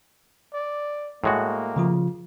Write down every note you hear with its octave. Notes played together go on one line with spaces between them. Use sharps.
D5
A2 G#3 A#3 F#4
C#3 F3 F4